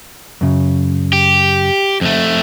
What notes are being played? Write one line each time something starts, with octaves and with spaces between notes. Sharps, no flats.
F#2 C#3
G4
F2 A3